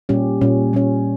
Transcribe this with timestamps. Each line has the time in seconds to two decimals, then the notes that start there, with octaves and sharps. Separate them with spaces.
0.09 A#2 G3 C#4 G4
0.41 A#2 G3 C#4
0.73 A#2 G3 C#4